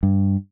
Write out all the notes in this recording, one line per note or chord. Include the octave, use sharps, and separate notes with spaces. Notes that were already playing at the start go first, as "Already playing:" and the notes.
G2